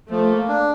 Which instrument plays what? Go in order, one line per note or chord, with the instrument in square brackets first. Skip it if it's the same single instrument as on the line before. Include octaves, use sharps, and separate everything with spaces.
[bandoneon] F3 [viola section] A3
[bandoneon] A#3
D4